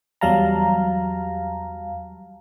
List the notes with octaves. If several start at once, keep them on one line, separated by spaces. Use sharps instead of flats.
E2 F#3 G3 F5 A5 A#5